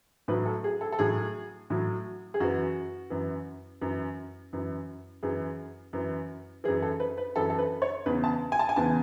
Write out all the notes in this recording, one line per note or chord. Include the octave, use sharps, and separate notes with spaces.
A2 F#3 B4
A4
G#4
A4
A4
A2 F#3 G#4
A2 F#3
G#4
F#2 E3 F#4
F#2 E3
F#2 E3
F#2 E3
F#2 E3 G#4
F#2 E3
F#2 E3 G#4
A4
B4
B4
F#2 E3 A4
A4
B4
C#5
E2 C#3 E3 B4
A5
G#5
A5
G#5
E2 C#3 E3 A5